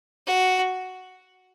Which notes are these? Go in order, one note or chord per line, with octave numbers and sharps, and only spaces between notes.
F#4